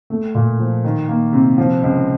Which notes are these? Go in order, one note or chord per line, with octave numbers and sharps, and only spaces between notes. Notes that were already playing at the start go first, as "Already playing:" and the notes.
A3
A#2
F3
D#3
A#3
C3
F3
C#2